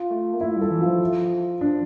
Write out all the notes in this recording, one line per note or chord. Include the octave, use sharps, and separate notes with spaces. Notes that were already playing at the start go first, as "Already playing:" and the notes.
Already playing: F4
A3
A#3
A3 E4
G3
A4
E3
F3 F4
D4